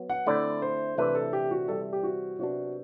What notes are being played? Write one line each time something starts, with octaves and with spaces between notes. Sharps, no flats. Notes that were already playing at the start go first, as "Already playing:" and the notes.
Already playing: F#3 B3
F#5
D3 A3 C4 E4 D5
C5
C3 E3 A3 D4 B4
A4
G4
F#4
C3 E3 G3 C4 A4
G4
F#4
C3 F#3 B3 D4 F#4